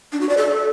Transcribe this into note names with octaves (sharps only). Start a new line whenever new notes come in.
D4
F#4
D5
A4